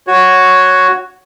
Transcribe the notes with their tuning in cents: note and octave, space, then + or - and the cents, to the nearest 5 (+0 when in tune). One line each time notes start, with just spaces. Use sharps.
F#4 +0 C#5 +0